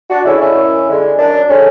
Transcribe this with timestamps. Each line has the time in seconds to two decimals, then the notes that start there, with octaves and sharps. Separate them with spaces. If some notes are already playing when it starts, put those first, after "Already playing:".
0.09 D4 F#4
0.24 D3 G#3 C#4 E4
0.40 C#4 E4
0.56 F#2
0.87 D3 G#3
1.18 F#2 D4
1.49 D3 G#3 C#4